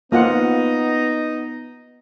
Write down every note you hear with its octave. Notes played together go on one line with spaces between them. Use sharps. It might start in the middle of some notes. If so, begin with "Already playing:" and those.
A#3 B3 D#4 F4 F#5